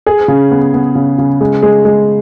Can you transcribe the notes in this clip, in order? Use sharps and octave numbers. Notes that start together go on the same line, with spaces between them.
G#4
C#3
B3
B3
C#3
C#3
G#3
G#3
G#3